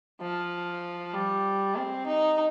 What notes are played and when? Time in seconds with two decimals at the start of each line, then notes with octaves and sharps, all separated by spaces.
0.21 F3
1.13 G3
1.76 C4
2.07 D#4